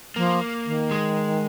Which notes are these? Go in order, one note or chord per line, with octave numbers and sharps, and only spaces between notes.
F3 A#3
D#3
G#3